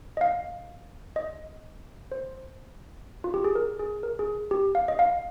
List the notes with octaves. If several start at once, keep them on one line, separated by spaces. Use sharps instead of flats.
D#5
F5
D#5
C5
F4
G4
G#4
A#4
G#4
A#4
G#4
G4
F5
D#5
F5